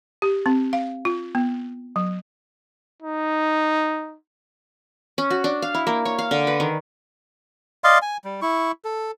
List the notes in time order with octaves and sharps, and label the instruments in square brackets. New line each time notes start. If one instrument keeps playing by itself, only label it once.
[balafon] G4
C4
F5
F4
B3
F#3
[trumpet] D#4
[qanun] C#4
F#4
D4
F5
E4
A#3
C#5
F5
D3
B4
D#3
[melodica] D5 D#5 F5 C6
G#5
G3
E4 C#6
A4